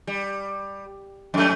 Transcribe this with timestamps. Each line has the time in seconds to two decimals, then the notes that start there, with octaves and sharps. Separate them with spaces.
0.07 G3
1.34 F2 A3